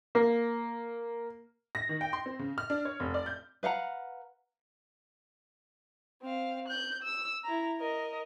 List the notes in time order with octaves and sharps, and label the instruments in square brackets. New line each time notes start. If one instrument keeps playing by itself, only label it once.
[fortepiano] A#3
[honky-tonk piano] A#6
D#3
G5
C6
C4
C#3
F6
D4
C#5
F1
D5
G6
[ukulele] B4 F5 F#5 A#5
[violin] C4 F5
F#6 G6
E6
E4 A#5
A#4 D#5